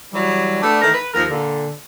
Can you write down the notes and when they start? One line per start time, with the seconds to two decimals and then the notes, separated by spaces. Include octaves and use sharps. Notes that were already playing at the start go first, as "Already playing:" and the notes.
0.13 E3 F#3 G3
0.61 A3 B3 D4
0.82 D#3 E3 A3 A#4
0.94 B4
1.14 D#2 F3 A#4
1.30 A#2 D3